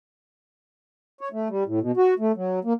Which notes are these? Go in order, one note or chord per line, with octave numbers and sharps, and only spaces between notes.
C#5
A3
G3
A2
B2
F#4
A3
F#3
A#3